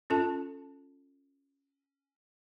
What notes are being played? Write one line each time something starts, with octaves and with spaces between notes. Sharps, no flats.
C#4 F4 A4 A5